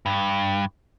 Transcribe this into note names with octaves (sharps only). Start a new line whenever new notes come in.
G2